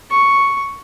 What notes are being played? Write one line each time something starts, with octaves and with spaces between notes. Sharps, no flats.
C#6